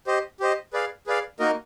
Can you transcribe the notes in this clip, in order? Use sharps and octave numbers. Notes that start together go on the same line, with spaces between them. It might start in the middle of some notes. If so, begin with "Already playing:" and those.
G4 C5 D#5
G4 C5 D#5
G#4 B4 D5 F5
G#4 B4 D5 F5
A#3 D#4 F#4 A#4 D#5